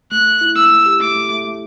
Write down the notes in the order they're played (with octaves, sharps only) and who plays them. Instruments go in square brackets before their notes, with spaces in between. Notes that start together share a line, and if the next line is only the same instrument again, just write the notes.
[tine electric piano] A3 [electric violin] F#6
[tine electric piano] A3
E4
[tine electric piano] A3 [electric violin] E6
[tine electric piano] A3
G4
[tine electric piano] A3 [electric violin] D6
[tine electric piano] A3
A3
A3